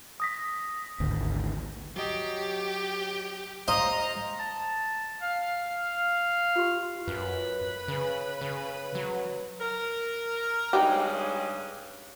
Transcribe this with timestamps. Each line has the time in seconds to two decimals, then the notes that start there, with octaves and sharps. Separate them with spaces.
0.20 D#6 A#6 B6
1.00 G#1 D2
1.96 F#3 G4 D#5
3.68 C5 D#5 F5 A#5 C6
4.40 A5
5.22 F5
6.56 F4 G4 C6
7.08 F#2 B4
7.88 C#3
8.41 C#3
8.95 F#3
9.61 A#4
10.73 G2 C#3 G#3 D#4 G4